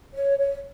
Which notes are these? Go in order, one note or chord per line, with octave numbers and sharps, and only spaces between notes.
C#5
C#5